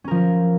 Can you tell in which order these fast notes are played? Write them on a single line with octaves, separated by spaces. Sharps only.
C#4 A#4 F3